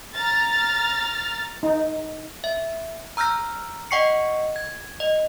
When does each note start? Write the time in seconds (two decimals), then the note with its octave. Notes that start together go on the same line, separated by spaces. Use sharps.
0.16 A#5 F6 A6
1.63 D#4
2.44 E5
3.17 A#5 E6 F6 G6 A#6
3.91 D#5 F#5 G5 C#6 C7 C#7
4.56 G#6
5.00 D#5